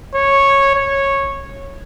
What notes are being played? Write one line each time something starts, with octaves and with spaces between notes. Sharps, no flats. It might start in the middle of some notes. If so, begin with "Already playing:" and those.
C#5
C#5